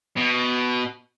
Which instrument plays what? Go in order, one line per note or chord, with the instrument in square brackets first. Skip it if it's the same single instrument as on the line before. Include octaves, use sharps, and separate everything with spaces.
[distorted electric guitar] B2